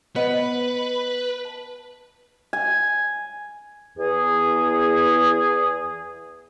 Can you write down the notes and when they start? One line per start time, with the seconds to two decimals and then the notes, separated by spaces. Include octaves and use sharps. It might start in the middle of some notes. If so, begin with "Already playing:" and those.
0.16 B3 B4 C5 D#5
1.45 A5
2.53 G#5
3.98 E2 G#4